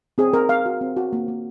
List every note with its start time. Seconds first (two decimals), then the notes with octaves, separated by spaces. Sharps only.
0.18 C4 G#4
0.33 C4 A#4
0.49 C4 F5
0.66 F#4
0.81 C4
0.97 F#4
1.13 A#3
1.28 A#3